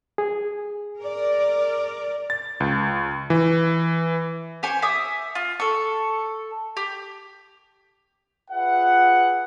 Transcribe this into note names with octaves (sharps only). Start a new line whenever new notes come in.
G#4
A#4 D5
A6
C#2
E3
G4 C5 G#5 C#6
E5 D6 D#6
F4
A4 C#6
G4
F4 G#4 B4 E5 F#5